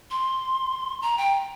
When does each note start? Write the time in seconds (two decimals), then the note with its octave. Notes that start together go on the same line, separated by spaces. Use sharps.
0.11 C6
1.02 A#5
1.18 G5